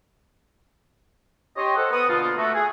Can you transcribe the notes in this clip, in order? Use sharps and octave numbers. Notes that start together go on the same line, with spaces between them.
G4 C#5 D#5 C6
A4 C5 F#5
B3 D#6
B2 D3 A#3 B3 F4
A3 F#4
G#4